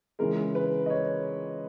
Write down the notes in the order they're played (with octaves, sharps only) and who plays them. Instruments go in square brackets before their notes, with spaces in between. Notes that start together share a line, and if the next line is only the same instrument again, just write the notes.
[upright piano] C#2 C#3 E3 G#3 A#4
B4
D#5
C#5